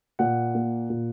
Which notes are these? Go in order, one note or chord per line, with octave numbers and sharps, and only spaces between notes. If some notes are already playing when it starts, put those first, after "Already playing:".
A#2 F#5
A#3
A#2